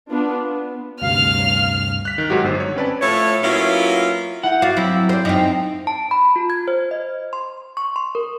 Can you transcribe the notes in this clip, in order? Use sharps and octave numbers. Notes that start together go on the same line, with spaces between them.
B3 D4 F4 B4
B3
D2 G2 C3 F5 F6
F#6 B6
D#3
G#2 D#3 F#3 F#4 G4
G1 C5
C#5
C4 C#4 B4 D5 A5
A2 F3 A3 C#5
F#3 A#3 B3 C#4 E4 F4
E4 F#5 G6
F#4 F5 D6 G6 A6
F#3 C4 E4
C5 D5
F#2 C4 D#4 A#6 C7
A5
B5
F4
G#6
C5
D#5
C6
C#6
C6
A#4